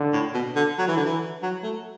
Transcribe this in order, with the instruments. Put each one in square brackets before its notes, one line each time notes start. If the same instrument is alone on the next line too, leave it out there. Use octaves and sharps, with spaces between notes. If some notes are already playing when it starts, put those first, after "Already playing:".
Already playing: [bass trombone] D3
[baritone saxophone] A2
B2
D3
F#3
E3
D3
E3
F#3
A3